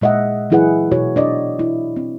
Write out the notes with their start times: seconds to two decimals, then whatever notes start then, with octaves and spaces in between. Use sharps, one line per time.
0.02 A#2 G#3 D#5 E5 F#5
0.50 E3 F#3 E4 G#4 B4 F#5
0.91 B2 F#4 C#5
1.16 D4 D5 D#5
1.59 E4
1.96 C4